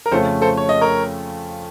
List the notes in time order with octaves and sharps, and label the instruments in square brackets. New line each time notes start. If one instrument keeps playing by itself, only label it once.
[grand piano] A#4
[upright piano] F2 C#3 A3 C#4 F4 [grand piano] A4 C5
[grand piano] A4 C5
C#5
D#5
A#4 C#5